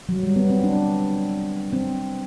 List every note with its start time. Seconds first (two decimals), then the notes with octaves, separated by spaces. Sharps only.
0.09 F#3
0.23 G3
0.36 B3
0.50 C4
0.64 D4
1.73 C4